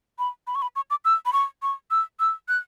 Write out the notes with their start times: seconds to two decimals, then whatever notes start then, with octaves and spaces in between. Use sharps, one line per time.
0.19 B5
0.47 B5
0.55 C#6
0.62 B5
0.76 C#6
0.90 D6
1.05 E6
1.26 B5
1.33 C#6
1.62 C#6
1.91 E6
2.20 E6
2.48 F#6